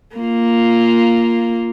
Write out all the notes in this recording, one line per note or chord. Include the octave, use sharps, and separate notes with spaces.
A#3 F4